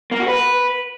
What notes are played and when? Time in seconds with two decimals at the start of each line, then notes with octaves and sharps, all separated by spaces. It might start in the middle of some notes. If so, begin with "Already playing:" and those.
0.11 A#3
0.20 F#4
0.28 B4